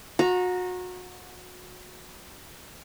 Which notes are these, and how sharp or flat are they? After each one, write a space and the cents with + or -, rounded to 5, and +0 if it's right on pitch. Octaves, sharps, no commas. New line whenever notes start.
F#4 -30 A#5 +0